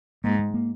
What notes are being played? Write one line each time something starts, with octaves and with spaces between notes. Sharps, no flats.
G#2 A#3
G#3
A#3